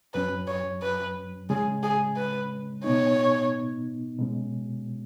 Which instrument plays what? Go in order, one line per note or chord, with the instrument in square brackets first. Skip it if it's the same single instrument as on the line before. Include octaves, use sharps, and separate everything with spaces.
[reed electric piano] F#2 F#3 C#4 [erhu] B4
[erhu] C#5
B4
[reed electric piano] C#3 G#3 C#4 [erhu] G#4
[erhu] G#4
B4
[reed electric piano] B2 B3 D#4 [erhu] C#5
[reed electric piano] B2 G#3 C#4